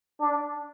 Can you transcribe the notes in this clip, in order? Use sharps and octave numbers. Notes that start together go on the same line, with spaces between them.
D4